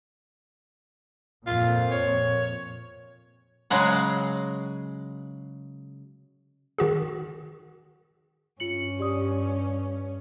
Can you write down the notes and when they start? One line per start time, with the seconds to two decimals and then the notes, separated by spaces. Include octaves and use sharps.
1.47 F2 A#2 F4
1.91 C#5
3.70 C#3 F#3 G#3 F#5
6.78 D#3 F#4 G#4
8.60 G2 C#4 F4 C#7 F#7
8.99 G4 D5 D#6